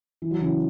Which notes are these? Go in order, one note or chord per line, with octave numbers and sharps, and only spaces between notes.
E3
F#3
C#3 E3